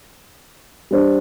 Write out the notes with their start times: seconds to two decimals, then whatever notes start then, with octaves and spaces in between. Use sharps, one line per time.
0.91 G3 D4 C5